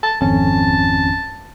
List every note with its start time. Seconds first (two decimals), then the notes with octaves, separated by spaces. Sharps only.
0.03 A5
0.21 G#1 F2 C#4 A5